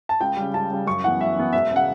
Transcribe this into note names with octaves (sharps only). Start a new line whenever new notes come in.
A5
C#2 G5
C#3 G3
C#2 A5
C#3 G3
F#2 C#6
E3 B3 F#5
F#2 E5
E3 B3
E1 E5
C#3
F#5